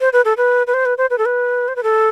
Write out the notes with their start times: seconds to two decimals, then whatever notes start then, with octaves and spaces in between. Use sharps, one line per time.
0.01 C5
0.13 B4
0.25 A4
0.37 B4
0.67 B4
0.74 C5
0.85 B4
0.98 C5
1.10 B4
1.18 A4
1.25 B4
1.68 C5
1.76 B4
1.83 A4